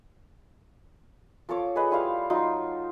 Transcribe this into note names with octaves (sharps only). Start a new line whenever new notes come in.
F3 A4 C#5 D6
G#4 A4 B4 D#5
G3 E4 C5 F5
F#3 D#4 F4 C6